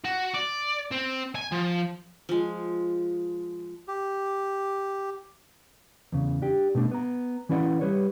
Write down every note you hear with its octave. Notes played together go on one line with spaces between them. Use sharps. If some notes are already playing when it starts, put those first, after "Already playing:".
F#4
D5
C4
G#5
F3
F3 G#3
G4
E2 C#3
D4 G4
B2 A3 D4
B3 A#5
E3 C#4 E4 B4 D5 F#5
G3 B4 C#5